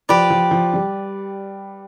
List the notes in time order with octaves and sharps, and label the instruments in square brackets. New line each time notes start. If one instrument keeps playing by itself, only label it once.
[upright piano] F3 [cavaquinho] G4 B4 D5
[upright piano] F3
F3
G3